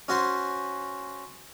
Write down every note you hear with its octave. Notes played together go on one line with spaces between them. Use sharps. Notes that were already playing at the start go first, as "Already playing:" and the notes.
C#4 F#4 C5